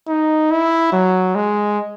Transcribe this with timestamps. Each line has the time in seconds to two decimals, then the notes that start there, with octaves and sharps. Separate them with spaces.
0.08 D#4
0.51 E4
0.92 F#3
1.35 G#3